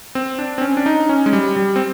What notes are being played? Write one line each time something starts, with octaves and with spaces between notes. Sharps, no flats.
C4
D4
C4
C#4
D4
D#4
C#4
G#3
G3
G3
C4